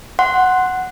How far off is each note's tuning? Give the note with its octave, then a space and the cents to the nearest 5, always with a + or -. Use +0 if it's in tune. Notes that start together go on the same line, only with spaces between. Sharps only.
F#5 +0 C6 +0